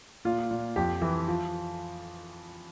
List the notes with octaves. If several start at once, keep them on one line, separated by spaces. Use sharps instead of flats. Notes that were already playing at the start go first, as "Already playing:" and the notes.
A#2 F4
A#2
F2 G4
E3
F3